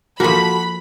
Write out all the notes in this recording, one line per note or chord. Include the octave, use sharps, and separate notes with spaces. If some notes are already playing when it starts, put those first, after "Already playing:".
F3 A#3 F#4 A4 B5